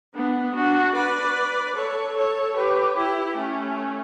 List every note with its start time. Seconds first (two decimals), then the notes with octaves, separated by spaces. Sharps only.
0.14 B3 D4
0.55 D4 F#4
0.95 B4 D5
1.75 A4 C#5
2.15 A4 C#5
2.56 G4 B4
2.96 E4 G4
3.36 A3 C#4